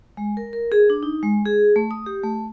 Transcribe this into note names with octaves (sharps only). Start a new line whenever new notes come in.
G#3
A#4
A#4
G#4
D4
D#4
G#3
G#4
A3
D#6
G4
A3